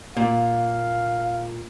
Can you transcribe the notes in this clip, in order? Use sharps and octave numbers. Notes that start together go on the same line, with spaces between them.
A#2 F5